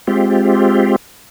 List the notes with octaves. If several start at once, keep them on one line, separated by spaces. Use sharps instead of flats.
G#3 C4 F4 G4